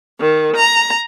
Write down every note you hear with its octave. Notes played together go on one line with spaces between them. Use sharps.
D#3
A#5